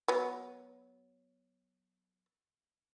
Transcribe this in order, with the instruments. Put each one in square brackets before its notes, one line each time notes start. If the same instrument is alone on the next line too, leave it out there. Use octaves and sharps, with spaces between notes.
[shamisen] F#3 B3